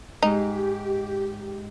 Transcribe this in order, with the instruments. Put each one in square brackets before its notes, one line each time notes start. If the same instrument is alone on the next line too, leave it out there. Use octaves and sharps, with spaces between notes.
[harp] G#2 G#3 [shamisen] D#4 [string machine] G4